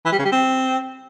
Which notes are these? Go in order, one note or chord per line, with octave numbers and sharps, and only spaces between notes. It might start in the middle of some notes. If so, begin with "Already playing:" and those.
E3
G3
C#3
G3
C4